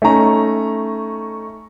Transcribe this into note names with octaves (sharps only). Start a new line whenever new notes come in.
A3 C#4 D#4 A#5